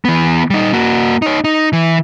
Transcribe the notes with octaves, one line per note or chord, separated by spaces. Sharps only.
E3 B3
G3 D#4
A#3 F#4
D#4 C#5
D#4
E3